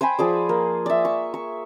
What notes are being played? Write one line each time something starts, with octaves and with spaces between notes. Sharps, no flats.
C5 G5 G#5 B5
F3 G#4 D5
A#3
D5 E5
C#6
C#6